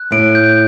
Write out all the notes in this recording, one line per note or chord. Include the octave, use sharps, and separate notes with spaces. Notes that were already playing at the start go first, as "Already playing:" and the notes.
Already playing: F#6
A2 D7
G6